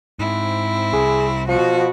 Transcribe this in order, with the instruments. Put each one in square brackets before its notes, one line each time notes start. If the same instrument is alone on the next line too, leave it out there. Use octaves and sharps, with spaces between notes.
[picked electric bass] G#2 [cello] C4 E4
[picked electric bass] C2 [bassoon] G#4
[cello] B2 F#4 [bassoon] F3